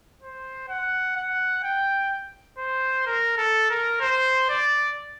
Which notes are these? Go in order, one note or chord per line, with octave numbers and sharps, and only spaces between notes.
C5
F#5
F#5
G5
C5
A#4
A4
A#4
C5
D5